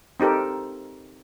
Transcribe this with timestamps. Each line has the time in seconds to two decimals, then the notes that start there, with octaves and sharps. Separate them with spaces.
0.20 C4 D#4 G4 A4 A#4